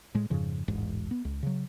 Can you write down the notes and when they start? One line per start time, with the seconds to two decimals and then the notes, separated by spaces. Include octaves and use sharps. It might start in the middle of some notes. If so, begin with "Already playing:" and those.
0.14 A2 G#3
0.30 F2 G#2 C#3 F3
0.68 E1 A1 G#2
1.11 B3
1.25 C#2
1.43 C#3 F#3